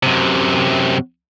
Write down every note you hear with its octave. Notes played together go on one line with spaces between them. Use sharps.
F#2 C3